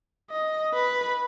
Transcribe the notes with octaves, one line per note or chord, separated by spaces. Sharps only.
D#5
B4